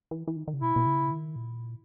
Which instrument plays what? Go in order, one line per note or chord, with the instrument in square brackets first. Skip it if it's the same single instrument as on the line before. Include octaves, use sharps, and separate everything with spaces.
[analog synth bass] E3
E3
D#3
D#3
C#3
[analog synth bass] B2 [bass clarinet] E4
[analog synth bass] B2
C#3
D#3
A#2